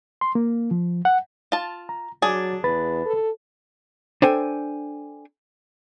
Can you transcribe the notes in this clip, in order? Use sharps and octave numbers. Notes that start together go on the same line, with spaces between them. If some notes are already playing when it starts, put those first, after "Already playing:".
C6
A#3
F3
F#5
F4 A5
A#5
F#3 D4 G#4 D6 A6
E2 B4 B5 A6
A4
D4 A4 C5 G5 G#5